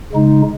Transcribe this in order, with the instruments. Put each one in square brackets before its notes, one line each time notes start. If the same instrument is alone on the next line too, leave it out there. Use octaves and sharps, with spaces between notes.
[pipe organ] C#3 G#3 D#4